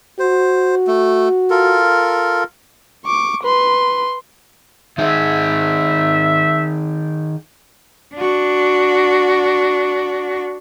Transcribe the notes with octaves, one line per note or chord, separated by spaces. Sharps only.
F#4 C5
A3
F4 A4 A#4
C#6 D6
B4 C6
D#3 D#4 G#4 E5
D4 F#4